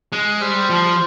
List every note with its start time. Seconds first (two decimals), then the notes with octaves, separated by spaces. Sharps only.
0.12 G#3
0.41 G3 C5
0.70 F3